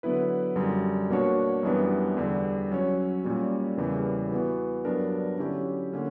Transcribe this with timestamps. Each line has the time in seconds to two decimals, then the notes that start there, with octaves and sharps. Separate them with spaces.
0.03 D3 F#3 B3 E4 B4
0.56 F#2 D3 G3
1.10 B2 A#3 D4 F#4 C#5
1.63 F#2 E3 G3 B3 D4
2.17 E2 D3 G3
2.71 F#3 C#4 F#4 C#5
3.24 A#2 G3 A#3 C#4
3.77 E2 C#3 E3 G3 A#3
4.32 E3 B3 F#4
4.85 G2 F#3 B3 D4 A#4
5.38 D3 F#3 C#4 E4 G4
5.93 D3 A#3 C#4